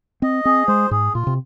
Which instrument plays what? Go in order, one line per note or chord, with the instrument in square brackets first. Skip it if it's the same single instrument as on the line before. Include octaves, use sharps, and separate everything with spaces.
[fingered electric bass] C4 [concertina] D#5
[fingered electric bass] C4 [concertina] G#4
[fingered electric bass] G#3 [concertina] C5
[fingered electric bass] G#2 [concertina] G#4
[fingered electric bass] A#2 [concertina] F4
[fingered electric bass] C3